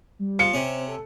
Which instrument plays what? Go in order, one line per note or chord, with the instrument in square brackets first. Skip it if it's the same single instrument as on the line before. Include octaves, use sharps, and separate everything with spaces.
[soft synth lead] G3
[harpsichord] F3 [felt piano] C#7
[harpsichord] C3 C#4 [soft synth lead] C4
[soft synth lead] A4